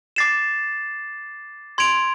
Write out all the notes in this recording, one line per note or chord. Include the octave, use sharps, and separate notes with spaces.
D6 A6 C7 E7
C6 G#6 D7 F7